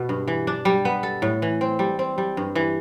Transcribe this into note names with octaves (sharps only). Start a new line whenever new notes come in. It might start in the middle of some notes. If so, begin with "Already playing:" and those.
Already playing: B2 B3
G2
E3
D4
G3
B3
A4
A2
E3
C4
G3
C4
G3
G2
E3